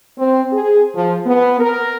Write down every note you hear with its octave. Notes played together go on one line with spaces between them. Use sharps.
C4
G#4
F3
B3
A#4